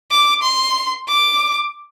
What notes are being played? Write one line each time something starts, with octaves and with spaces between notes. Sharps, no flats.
D6
C6
D6